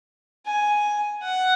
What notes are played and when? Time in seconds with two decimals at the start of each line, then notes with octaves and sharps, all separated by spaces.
0.46 G#5
1.22 F#5